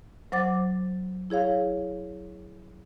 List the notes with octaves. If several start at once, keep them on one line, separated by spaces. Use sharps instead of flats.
F#3 C5 F#5 D6 A6
E4 G#4 C#5 F5